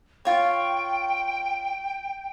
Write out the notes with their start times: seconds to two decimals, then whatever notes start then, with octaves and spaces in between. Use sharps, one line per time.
0.25 F4 C#5 G5